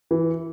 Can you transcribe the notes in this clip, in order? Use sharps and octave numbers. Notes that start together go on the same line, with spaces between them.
E3